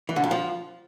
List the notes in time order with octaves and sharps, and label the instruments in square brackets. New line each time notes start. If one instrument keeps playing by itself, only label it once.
[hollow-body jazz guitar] E3
D3
F2
F3